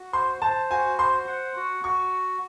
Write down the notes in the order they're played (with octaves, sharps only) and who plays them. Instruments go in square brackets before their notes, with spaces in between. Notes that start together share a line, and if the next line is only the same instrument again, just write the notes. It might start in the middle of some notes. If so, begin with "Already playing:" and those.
Already playing: [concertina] F#4
[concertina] C5 [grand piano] C6
[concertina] C5 [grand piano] A5
[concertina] F#4 [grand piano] G#5
[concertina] C5 [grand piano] C6
[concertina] F#5
F#4
[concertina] F#4 [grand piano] C#6